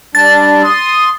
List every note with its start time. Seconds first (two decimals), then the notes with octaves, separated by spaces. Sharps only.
0.15 G3 D4 A6
0.64 C6 D#6